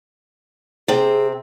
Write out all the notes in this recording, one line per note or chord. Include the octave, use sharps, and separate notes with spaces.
C3 C4 G#4